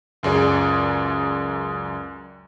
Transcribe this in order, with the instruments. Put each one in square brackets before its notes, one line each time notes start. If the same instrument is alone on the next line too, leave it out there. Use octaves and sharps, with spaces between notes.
[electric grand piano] C#2 F#2 G#4 D5